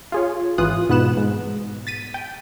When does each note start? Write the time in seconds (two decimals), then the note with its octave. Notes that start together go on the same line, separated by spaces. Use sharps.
0.12 F4 G#4 C#5
0.58 G#1 E3 F4 D#6 F#6
0.89 G#2 B2 B3 F#6 E7
1.17 G#2
1.87 A6 B6 D#7
2.14 G5